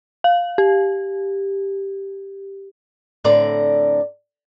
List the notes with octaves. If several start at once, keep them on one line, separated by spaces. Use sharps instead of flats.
F5
G4
A2 D3 C4 D5 A#5